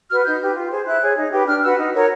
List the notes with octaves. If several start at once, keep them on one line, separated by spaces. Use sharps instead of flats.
F#4 B4 F6
D#4 G6
G4 B4
F4
G#4 C5
E4 F#6
G#4 C#5
D#4
G4 B4
D4 F6
F#4 B4 E6
D#4
F#4 A#4 C#5